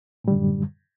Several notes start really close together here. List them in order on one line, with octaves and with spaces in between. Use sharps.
A2 G3 D3 F#2